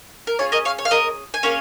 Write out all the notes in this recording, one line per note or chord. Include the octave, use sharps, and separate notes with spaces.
A#4
C#4 F4 G#4 C#5
A#4 D#5
C#5 F5
C#5
F5
A#4 D#5
G#5
A#3 C#4 G#4 C#5 F5